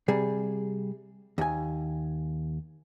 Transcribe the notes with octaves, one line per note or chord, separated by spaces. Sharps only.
C3 G3 G#4
D#2 G#5